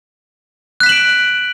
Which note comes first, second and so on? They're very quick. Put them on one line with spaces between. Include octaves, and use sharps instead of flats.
F#6 B6 E7 F#7 D7